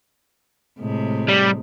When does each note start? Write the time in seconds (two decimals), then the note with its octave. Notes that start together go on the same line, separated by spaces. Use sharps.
0.80 A2 C3 G#3
1.28 G3